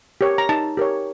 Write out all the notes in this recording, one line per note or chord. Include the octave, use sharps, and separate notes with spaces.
G4 A#4 C#5
A#5
D#4 A5
G4 A#4 C#5